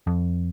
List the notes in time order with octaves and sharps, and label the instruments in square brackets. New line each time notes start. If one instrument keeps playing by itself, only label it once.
[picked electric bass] F2